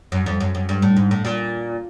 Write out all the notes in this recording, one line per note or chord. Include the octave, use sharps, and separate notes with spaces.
F#2
F2
F#2
F#2
G2
A2
G#2
A2
A#2